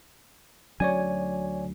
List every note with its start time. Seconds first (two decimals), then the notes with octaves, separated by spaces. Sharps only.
0.80 D2 F#3 C#4 C#5 D5 G#5